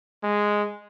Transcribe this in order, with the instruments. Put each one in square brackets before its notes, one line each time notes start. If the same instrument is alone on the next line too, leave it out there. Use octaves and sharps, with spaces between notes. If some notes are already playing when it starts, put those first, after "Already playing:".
[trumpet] G#3